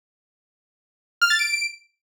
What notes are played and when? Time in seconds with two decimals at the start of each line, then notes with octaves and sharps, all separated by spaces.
1.22 F6
1.30 A6
1.39 D7